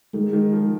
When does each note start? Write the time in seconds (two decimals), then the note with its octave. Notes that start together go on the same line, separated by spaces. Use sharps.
0.14 D#3 G#3
0.33 D#3
0.52 F3